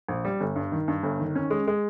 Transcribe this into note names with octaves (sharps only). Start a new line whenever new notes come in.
A#1
G3
G1
G2
D#3
G2
G1
D#3
C#4
G#3
G#3